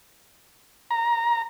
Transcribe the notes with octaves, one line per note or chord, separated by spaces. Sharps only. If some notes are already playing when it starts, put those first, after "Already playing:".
A#5